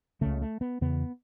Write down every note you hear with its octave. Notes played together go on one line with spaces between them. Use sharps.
C#2 C#3 A3
A3
B3
E2 C#3 B3